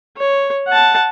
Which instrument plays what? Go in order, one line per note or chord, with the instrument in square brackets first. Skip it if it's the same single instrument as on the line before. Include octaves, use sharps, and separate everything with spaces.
[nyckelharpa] C#5
F#5 A5